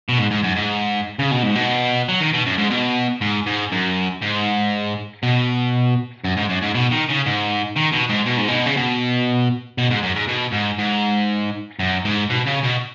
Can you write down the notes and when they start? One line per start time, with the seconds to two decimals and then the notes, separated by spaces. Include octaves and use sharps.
0.09 B2
0.18 G#2
0.31 G#2
0.44 F#2
0.56 G#2
1.19 C#3
1.31 B2
1.43 G#2
1.55 B2
2.09 F#3
2.21 D#3
2.33 B2
2.46 F#2
2.58 G#2
2.71 B2
3.21 G#2
3.47 G#2
3.72 F#2
4.22 G#2
5.23 B2
6.24 F#2
6.37 G#2
6.49 F#2
6.62 G#2
6.75 B2
6.91 D#3
7.09 C#3
7.26 G#2
7.76 D#3
7.92 B2
8.09 G#2
8.26 B2
8.37 G#2
8.48 B2
8.66 C#3
8.77 B2
9.78 B2
9.90 G#2
10.03 F#2
10.16 G#2
10.28 B2
10.53 G#2
10.79 G#2
11.79 F#2
12.05 G#2
12.30 B2
12.47 C#3
12.64 B2